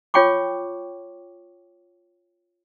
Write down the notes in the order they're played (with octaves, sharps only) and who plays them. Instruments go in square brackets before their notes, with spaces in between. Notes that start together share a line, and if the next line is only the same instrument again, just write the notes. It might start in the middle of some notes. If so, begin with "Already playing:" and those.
[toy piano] F4 C#5 G5 C#6 D6